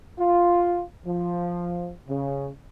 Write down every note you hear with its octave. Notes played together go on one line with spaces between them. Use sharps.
F4
F3
C#3